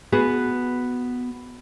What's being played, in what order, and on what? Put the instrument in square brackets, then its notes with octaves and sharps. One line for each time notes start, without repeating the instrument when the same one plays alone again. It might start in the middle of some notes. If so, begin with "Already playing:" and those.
[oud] B3 F#4 G#4